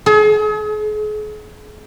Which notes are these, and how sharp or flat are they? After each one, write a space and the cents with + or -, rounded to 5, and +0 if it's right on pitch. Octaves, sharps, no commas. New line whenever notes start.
G#4 +40